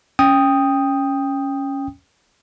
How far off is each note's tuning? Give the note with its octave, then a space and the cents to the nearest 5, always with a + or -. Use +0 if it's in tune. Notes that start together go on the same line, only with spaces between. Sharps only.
C#4 +0 G5 +15 D#6 +0